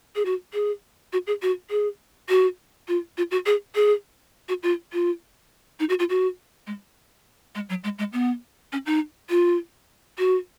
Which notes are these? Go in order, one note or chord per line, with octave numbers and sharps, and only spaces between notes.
G#4
F#4
G#4
F#4
G#4
F#4
G#4
F#4
F4
F4
F#4
G#4
G#4
F#4
F4
F4
D#4
F#4
F4
F#4
G#3
G#3
F#3
G#3
G#3
B3
C#4
D#4
F4
F#4